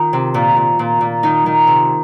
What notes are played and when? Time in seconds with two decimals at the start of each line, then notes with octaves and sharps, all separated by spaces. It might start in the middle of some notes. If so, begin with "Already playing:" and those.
Already playing: D#3 F4
0.13 C3
0.34 A#2
0.57 A#2
0.79 A#2
1.01 A#2
1.23 D#3 D#4
1.46 D#3
1.67 C3